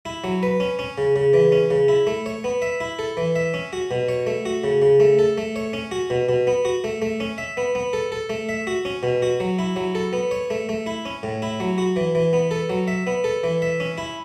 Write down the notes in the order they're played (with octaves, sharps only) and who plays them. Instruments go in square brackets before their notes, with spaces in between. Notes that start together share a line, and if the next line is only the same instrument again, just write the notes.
[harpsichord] E4
F#3
B4
C#4
C#4
C#3
C#3
E3
C#4
C#3
E4
A3
C#5
B3
E5
E4
A4
E3
E5
C#4
F#4
B2
C#5
A3
F#4
C#3
C#3
A3
A4
A3
C#5
C#4
F#4
B2
B2
B3
F#4
A3
A3
C#4
E5
B3
B3
A4
A4
A3
E5
F#4
C#4
B2
F#4
F#3
E4
F#3
A4
B3
C#5
A3
A3
E4
C#4
A2
E4
F#3
F#4
E3
E3
B3
A4
F#3
E5
B3
A4
E3
E5
C#4
E4